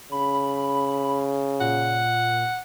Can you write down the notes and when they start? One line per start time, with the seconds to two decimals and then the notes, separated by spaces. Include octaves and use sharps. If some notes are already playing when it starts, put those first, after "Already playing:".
0.12 C#3 B5
1.61 A#2 F#5